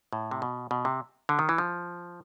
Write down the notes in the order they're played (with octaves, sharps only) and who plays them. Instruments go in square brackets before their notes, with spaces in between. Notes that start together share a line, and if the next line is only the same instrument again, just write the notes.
[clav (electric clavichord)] A2
C3
B2
B2
C3
D3
D#3
E3
F3